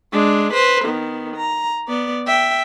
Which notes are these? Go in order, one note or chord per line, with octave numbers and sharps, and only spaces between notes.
G#3 D4
B4 C5
D#3 B3
A#5
B3 D5
E5 G5